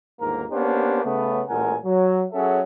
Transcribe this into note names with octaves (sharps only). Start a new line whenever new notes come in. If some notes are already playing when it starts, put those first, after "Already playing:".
G1 D#2 G#2 A#3 A#4 A#5
A#3 B3 C#4 D4 G4 C5
C#3 A3 B3
A1 A#2 G#3 A#4 F#5 G#5
F#3
F#3 C#4 G#4 A4 E5 F#5